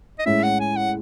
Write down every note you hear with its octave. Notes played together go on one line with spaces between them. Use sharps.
D#5
A2 G#3 C#4 E4 E5
F#5
G#5
F#5